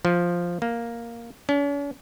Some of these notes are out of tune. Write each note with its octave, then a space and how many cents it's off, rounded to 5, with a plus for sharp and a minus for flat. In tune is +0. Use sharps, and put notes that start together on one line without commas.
F3 +0
A#3 +0
C#4 +45